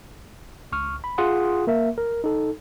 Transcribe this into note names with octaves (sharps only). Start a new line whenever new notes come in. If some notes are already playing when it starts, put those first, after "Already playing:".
C#2 C#6 F6
B5
F4 G#4 F#5 C6 D#6
A#3 A#4 E5
A#4
D#4 A4